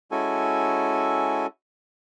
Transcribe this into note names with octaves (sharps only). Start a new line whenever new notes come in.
G#3 C#4 E4 F#4 A4 G#5